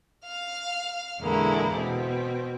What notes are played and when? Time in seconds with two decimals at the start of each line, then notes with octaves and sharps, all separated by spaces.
0.24 F5 F6
1.21 E2 A#2 D3 G#3 A#3 E4
1.74 B2 C4